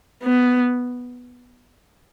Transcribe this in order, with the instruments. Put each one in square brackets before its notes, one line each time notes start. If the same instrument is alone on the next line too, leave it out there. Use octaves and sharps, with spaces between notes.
[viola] B3